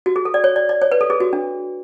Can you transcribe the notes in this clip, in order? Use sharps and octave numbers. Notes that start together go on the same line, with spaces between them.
F#4
G#4
A4
D5
C#5
D5
D5
C#5
B4
A4
G#4
F#4
D4